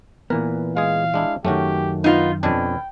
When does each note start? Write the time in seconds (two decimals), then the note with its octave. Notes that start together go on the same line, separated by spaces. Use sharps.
0.30 A#2 E3 B3 A#4
0.77 G#3 G#4 F5
1.14 G#3 D4 E4
1.45 F#2 D#3 A3 C#4 F#4 G4
2.04 B3 D#4 F4
2.43 F2 B2 C#4 D4 G5